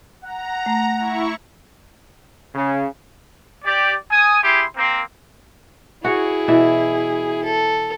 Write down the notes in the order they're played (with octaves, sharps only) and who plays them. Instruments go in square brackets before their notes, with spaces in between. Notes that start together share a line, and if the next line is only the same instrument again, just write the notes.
[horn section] F#5 [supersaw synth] A#5
[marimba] A3
[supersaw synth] E4 C#6
[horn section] C#3
[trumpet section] G4 D5
G#5 D#6
E4 G4 G#4 C6
A#3 C4
[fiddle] E4 G#4 [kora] F#4 C#5
[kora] B2 E3 E5
[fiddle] A4